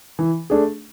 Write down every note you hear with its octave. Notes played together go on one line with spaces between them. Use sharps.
E3
A3 D4 G#4